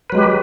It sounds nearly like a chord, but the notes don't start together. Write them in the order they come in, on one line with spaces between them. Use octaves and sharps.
B4 F#3 G#3 G4